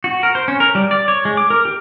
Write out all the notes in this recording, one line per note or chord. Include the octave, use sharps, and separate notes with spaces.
F#4
A#4
C5
C#4
A#4
G3
D5
C#5
G#3
D6
A#4
G4